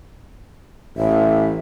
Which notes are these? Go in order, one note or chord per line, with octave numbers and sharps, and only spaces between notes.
A1 E5